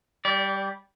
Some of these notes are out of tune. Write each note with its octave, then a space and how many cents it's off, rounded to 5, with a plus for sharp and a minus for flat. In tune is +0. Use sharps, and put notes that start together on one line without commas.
G3 +0 D5 -30